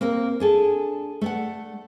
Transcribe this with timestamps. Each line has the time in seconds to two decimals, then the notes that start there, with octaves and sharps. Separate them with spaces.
0.01 A#3 C4 A#4
0.40 D4 G#4 A4
1.21 A3 D5 F#5